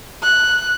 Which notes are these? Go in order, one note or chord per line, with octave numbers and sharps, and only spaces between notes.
F#6